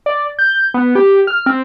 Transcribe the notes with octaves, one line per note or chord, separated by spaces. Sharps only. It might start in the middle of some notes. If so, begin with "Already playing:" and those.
D5
G6
B3
G4
F6
C4